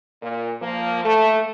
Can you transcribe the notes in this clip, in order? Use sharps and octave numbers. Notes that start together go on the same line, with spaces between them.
A#2
F3 A#3
A3